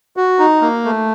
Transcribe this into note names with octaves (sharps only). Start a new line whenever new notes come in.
F#4
D#4
A#3
A3